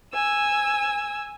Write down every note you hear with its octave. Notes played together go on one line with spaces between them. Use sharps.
G#5 E6